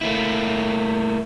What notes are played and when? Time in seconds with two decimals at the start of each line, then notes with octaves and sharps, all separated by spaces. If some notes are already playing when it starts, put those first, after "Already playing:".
0.01 A3 A#3 E4